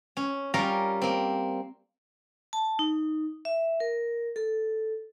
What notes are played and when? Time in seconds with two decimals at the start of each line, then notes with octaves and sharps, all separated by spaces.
0.17 C#4
0.54 G3 C#4 F4 A#4 A#5 C6
1.02 A#3 C4
2.53 A5
2.79 D#4
3.45 E5
3.80 A#4
4.36 A4